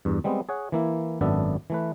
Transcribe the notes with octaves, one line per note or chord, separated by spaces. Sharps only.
E2 G2
G3 G#3 B3 C4
G#4 C#5 F#5
E3 A#3 E4
G#1 F#2 B3 D4 A4 E5
E3 A3 B4